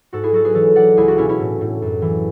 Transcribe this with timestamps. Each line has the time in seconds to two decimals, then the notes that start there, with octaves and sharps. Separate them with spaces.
0.13 G#2 F#4 A4
0.23 E4 G#4
0.32 F#3 F#4 A4
0.45 G#4 B4
0.55 E3 A4 C#5
0.76 E3 D5 F#5
0.97 C#2 E4 G#4
1.08 D4 F#4
1.18 B2 C#4 E4
1.29 C#4 E4
1.40 A2
1.61 A2
1.82 F#2
2.02 E3